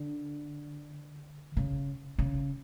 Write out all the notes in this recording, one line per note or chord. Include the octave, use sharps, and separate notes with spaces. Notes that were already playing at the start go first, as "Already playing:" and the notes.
Already playing: D3
C#3
C#3